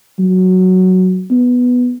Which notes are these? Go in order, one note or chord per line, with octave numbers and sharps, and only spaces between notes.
F#3
B3